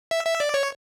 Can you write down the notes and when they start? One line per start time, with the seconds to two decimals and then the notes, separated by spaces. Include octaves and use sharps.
0.11 E5
0.26 E5
0.40 D5
0.54 C#5